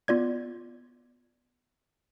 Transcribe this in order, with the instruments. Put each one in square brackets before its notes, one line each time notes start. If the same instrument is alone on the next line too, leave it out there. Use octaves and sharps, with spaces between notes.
[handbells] B3 F4 D5 G#6